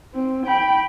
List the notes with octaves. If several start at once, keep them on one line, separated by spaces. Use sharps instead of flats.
C4
G5 B5